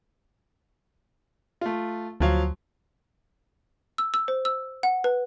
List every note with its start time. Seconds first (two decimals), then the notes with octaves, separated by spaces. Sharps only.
1.61 A3 F4
2.20 D2 F3 F#3 F5
3.98 E6
4.14 E6
4.28 C5
4.45 E6
4.83 F#5
5.04 B4